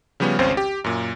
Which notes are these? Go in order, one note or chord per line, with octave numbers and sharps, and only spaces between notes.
C#3 F3 G3 B3 C#4
G#1 C#2 C4 C#4 C5
G4
F#2 A#2